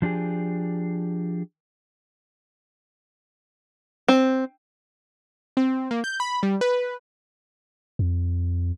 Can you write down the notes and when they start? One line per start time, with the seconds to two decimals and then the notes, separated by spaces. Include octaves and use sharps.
0.02 F3 D4 G4 G#4
4.08 C4
5.57 C4
5.91 A#3
6.04 G6
6.20 B5
6.43 G3
6.61 B4
7.99 F2